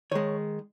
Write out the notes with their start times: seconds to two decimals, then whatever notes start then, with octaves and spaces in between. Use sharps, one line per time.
0.11 D#3 G#3 C#5